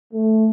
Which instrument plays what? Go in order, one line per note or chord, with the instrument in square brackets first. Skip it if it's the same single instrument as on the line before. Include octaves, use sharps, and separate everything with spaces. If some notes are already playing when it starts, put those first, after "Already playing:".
[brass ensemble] A3